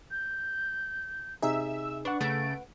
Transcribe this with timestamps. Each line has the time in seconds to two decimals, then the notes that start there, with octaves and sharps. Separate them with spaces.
0.11 G6
1.42 C3 D#4 G#4 E5 E6
2.05 D4 B4 F#5 C#6
2.20 C#3 A3 A6 D7